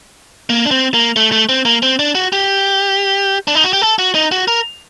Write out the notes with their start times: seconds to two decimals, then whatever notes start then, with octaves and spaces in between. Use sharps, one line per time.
0.50 A#3
0.65 D4
0.71 C4
0.94 A#3
1.16 A3
1.32 A3
1.49 C4
1.65 A#3
1.83 C4
1.99 D4
2.15 F#4
2.33 G4
3.48 D4
3.55 D#4
3.64 F#4
3.73 G4
3.82 A4
3.99 F#4
4.15 D#4
4.32 F#4
4.48 A#4